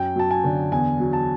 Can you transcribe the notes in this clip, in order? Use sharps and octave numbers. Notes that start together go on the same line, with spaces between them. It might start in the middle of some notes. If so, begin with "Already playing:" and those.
Already playing: F#2 G5
F#3 A5
G#5
D3
E2 G#5
F#3
A5